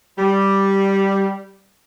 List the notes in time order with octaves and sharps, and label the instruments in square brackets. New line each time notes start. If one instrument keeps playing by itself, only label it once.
[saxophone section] G3